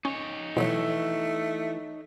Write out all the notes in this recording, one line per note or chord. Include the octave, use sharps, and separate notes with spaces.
C#4 D#4 C#5
B2 E3 F#3 A3